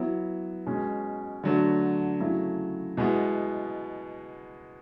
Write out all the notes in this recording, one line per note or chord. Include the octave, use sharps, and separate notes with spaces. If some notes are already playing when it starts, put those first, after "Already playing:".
Already playing: F#3 B3 E4
B2 G#3 C#4
D3 F#3 A3
C#3 F#3 A3 E4
B2 G#3 B3 E4